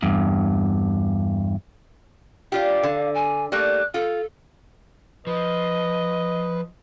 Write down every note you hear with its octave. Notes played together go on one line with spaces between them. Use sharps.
E2 G2
D4 F4 G4 F5
D3
G#5
G3 A3 A#3 F#6
F4 A4
F3 B4 D#5